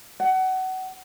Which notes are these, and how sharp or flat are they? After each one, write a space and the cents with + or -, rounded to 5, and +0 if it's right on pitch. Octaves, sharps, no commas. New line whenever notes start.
F#5 +25